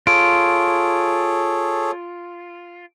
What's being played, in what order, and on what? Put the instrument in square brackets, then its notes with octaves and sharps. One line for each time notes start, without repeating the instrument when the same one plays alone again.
[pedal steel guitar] F4 [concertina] G#4 A4 C#5 [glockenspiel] D7